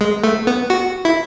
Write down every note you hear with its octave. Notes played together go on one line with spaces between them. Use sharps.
G#3
A3
B3
F#4
E4